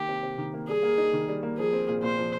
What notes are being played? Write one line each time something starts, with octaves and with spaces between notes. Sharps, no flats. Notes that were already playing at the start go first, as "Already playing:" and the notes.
Already playing: D#3 A#3 G4
C3
C3
D#3
A#3
G3 G#4
A#3
D#4
D#3
G3
A#3
F3 G#4
C4
A#2
A#2 C5
F3